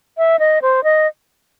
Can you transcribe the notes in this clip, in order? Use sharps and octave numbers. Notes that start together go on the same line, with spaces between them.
E5
D#5
C5
D#5